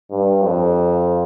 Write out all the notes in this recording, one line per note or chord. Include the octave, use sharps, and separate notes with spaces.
G2
F2